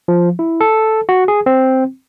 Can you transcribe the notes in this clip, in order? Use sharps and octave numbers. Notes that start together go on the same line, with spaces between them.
F3
E4
A4
F#4
G#4
C4